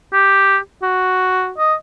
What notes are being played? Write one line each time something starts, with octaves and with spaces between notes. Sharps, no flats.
G4
F#4
D#5